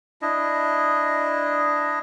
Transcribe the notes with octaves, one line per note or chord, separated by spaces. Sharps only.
D4 E4 D#5